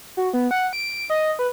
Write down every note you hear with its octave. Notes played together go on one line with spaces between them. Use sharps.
F#4
B3
F#5
D7
D#5
B4